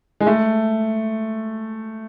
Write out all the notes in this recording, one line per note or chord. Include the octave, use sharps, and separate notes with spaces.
G#3
A3